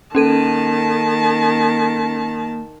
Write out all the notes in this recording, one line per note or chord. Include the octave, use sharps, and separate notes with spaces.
D#3 A#3 C#4 A4 A5 D#7